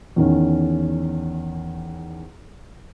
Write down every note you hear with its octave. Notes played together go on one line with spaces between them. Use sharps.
E2 D#3 C#4